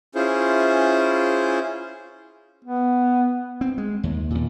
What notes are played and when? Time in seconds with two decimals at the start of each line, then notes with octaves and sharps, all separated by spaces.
0.15 C#4 E4 F4 G#4 C5
2.65 B3
3.61 C4
3.78 G#3
4.03 D#2
4.30 D#2 A#2